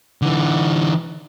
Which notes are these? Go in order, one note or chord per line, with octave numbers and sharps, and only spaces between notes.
D3 E3